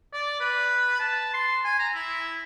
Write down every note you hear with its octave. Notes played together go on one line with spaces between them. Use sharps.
D5
B4
A5
C6
G#5
A#5
E4